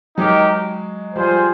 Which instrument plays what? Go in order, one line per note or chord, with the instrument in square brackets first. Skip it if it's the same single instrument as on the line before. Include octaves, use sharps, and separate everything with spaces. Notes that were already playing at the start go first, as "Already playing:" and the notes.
[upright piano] F#3 G#3 [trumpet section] D#4 G4 A#4
[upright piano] F3 G3 [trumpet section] F4 G#4 C5